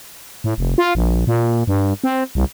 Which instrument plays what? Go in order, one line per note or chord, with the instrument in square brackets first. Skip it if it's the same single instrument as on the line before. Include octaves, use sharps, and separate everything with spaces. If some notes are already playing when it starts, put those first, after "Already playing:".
[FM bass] A2
F1
F4
A#1
A#2
G2
C4
C2